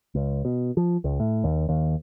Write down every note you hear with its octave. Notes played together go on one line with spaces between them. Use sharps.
C#2
B2
F3
C#2
A2
D#2
D#2